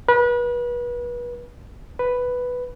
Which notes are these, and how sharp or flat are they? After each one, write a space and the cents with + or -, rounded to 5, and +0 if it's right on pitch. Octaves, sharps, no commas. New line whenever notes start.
B4 -35
B4 +0